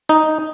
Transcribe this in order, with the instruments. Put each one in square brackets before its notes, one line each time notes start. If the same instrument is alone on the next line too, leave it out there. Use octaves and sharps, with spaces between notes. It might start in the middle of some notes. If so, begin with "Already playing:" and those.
[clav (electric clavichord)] D#4